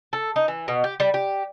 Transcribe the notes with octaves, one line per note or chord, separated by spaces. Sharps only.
A4
D#4
E3
B2
G4
G3
G4